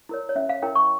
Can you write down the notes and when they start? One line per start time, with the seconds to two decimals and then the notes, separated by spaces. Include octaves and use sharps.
0.09 E4 A#4 C#5
0.29 C#5
0.36 C#4 E5
0.49 F5
0.63 E4 A#4 C#5 G5
0.76 C#6